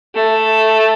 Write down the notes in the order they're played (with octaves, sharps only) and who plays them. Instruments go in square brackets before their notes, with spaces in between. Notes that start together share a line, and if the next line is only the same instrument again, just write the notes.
[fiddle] A3